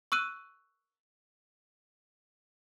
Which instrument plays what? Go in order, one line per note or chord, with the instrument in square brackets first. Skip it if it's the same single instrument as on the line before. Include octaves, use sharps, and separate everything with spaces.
[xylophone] C#6 E6 F#6 D#7